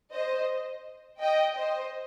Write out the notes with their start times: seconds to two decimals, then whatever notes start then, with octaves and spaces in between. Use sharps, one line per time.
0.13 C5 D#5
1.21 D#5 G5
1.56 C5 D#5